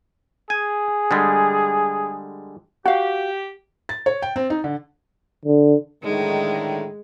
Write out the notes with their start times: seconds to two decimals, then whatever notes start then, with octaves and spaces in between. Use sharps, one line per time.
0.50 G#4 G#5
1.11 D3 G3 G#3
2.86 F#4 G4 F5 F#5
3.89 A6
4.06 C#5
4.22 G5
4.36 C4
4.50 D#4
4.64 D3
5.45 D3
6.03 A2 D3 D#3 G#3